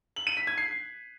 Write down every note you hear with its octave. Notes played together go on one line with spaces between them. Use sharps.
F#7
D#7
B6
G#6
C7